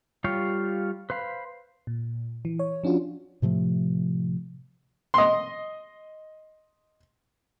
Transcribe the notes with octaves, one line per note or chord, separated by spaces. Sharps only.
G3 F4 G4 C#5 F5
B4 C5 F5 B5
A#2
E3
C#5
F3 C#4 D4 F4 F#4
A2 C3 F3 A3
D#5 C6